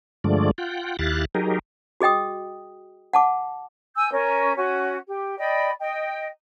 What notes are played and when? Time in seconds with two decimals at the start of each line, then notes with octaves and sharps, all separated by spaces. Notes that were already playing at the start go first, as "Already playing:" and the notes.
0.24 G2 D3 F3 G#3 A3 D5
0.58 F4 F#5 G5
0.99 D#2 E4 G4 F5 F#6 A6
1.35 F#3 D#4 G4 G#4 A#4
2.01 F#4 G#4 D#5 G5 D#6
3.13 F#5 A5 D6
3.95 G#5 E6 G6
4.11 C#4 A#4
4.56 C#4 F#4
5.07 G4
5.38 D5 D#5 G5 B5
5.79 D#5 G5